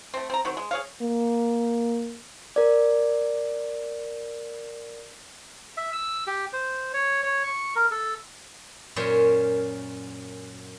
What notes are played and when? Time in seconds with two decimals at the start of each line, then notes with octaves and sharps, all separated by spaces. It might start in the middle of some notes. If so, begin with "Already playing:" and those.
0.14 A3 C4
0.30 C4 A#5
0.45 D#3 F#3 C4
0.57 G#3
0.71 G#4 C#5 F5
1.01 A#3
2.56 A#4 D5
5.77 E5
5.93 E6
6.27 G4
6.53 C5
6.94 C#5
7.23 C#5
7.44 C#6
7.76 A#4
7.91 A4
8.96 F#2 A#2 C#4 A#4 C5 C#5